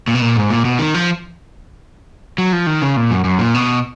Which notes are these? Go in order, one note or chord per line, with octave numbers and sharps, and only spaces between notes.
A#2
B2
A#2
G#2
A#2
B2
D#3
F3
F#3
F3
D#3
C#3
A#2
F#2
F#2
A#2
B2